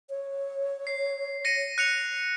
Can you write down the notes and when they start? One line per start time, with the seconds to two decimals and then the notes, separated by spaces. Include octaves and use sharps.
0.10 C#5
0.87 C7
1.45 A#6 C#7 D#7
1.78 F#6 C#7 F7